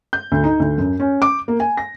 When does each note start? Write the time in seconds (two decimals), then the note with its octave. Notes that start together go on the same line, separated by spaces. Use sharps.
0.13 G6
0.32 D2
0.44 D#4
0.60 D2
0.78 F#2
1.00 C#4
1.22 D6
1.48 A#3
1.60 G#5
1.77 A#6